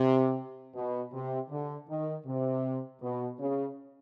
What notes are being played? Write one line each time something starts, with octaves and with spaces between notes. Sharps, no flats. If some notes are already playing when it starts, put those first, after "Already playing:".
Already playing: C3
B2
C3
D3
D#3
C3
B2
C#3